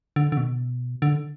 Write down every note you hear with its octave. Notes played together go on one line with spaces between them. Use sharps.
D3
D3
B2
D3